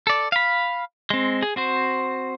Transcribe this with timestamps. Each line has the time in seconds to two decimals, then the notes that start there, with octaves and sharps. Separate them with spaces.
0.07 A4 D5
0.32 F5 B5
1.10 G#3 C4
1.43 G#4
1.56 C4 F#4 C5